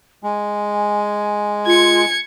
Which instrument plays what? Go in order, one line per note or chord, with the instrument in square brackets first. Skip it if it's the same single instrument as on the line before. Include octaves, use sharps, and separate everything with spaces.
[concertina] G#3 [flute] G#5
[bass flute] F4 [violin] G#6 C#7